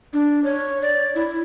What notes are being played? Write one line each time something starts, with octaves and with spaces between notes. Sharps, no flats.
D4
C#5
D5
E4